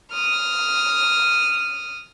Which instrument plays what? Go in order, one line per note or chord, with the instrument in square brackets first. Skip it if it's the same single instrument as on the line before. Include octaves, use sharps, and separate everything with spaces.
[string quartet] D#6 F6